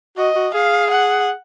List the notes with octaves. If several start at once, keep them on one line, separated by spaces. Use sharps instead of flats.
F#4 D#5
F#4
G#4 F5
F#5